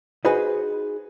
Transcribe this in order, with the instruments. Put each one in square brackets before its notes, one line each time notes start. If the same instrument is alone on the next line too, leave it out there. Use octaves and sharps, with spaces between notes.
[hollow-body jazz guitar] D#4 F#4 G#4 B4 C5 D#5